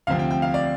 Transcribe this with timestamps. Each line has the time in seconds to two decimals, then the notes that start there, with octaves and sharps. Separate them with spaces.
0.07 D2 C3 F3 C4 F5
0.19 G5
0.31 G5
0.42 F5
0.54 D5